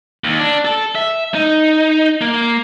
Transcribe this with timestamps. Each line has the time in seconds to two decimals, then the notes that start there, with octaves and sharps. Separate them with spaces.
0.24 D#2
0.40 D4
0.65 A4
0.95 E5
1.34 D#4
2.21 A#3